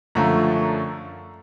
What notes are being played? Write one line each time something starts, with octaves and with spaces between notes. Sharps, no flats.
F#2 D3 F3 A3 A#5